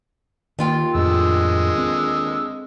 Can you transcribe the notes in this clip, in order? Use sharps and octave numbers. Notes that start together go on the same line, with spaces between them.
D#2 D#3 F4 G5
F2 A2 D3 G#3 E6
C4